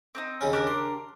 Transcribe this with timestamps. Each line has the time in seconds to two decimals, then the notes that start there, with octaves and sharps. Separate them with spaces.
0.15 C4 D4 D#4
0.41 D#2 C#3 C#4
0.53 D4 G4 A#4
0.67 C6